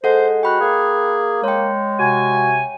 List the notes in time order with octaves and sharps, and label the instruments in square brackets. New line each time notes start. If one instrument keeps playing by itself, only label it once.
[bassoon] G#3 [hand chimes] A4 F#5 [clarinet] C5
[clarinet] F#4 [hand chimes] G5 B5 F#6
[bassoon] A#3 [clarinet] G#4
[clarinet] G#3 [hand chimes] C#5 G5
[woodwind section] C3 G#5 [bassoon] F#4